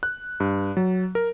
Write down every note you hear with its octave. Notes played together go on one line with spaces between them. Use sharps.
F#6
G2
F#3
A#4